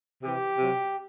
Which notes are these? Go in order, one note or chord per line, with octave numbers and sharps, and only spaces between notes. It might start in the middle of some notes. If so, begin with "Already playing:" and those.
C3 E3 G4
C3 F#3